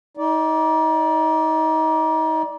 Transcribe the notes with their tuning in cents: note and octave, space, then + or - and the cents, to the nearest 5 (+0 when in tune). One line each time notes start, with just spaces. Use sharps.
D#4 +30 D5 -10